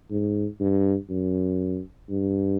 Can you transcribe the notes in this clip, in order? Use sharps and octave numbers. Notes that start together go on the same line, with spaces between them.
G#2
G2
F#2
G2